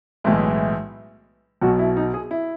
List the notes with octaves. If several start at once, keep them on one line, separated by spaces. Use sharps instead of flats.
B1 A2 E3 G#3 E4
B1 B2 F#3 F#4
E4
D#4
G#4
E4